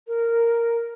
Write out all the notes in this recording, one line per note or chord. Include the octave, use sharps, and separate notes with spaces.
A#4